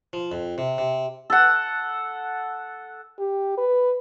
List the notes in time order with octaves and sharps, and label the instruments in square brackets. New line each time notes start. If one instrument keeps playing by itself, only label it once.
[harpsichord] F3
F2
C3
C3
[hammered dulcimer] A4 F#5
[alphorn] G4
B4